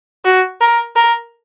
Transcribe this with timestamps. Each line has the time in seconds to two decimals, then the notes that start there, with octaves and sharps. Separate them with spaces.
0.25 F#4
0.61 A#4
0.96 A#4